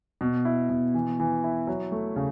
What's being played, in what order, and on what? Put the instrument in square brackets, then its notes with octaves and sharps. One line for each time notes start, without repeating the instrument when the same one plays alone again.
[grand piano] B2
E4
B2
E3
E3
E4
F#3
A3
C#3